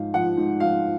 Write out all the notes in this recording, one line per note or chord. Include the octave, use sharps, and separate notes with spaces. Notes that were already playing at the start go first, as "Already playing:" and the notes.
Already playing: G#2 F3 F5
F3 F#5
G#2
F3 F5